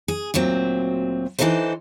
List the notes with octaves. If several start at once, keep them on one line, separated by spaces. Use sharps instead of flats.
G#4
D2 A#2 F#3 C4
D3 E3 F#3 D#4 A4 C5